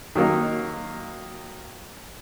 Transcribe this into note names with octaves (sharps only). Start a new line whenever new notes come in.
D#3 F#3 A#3 D#4